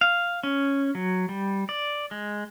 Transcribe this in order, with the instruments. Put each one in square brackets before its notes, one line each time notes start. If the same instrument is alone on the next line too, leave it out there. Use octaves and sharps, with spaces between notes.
[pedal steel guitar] F5
C#4
F#3
G3
D5
G#3